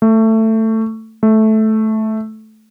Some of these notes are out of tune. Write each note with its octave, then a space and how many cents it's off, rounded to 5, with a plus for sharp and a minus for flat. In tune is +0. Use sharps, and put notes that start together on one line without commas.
A3 +15
A3 -10